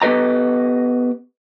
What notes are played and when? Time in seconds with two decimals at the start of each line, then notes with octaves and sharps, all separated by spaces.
0.02 B3 G4 A4 B4 D#5 A#5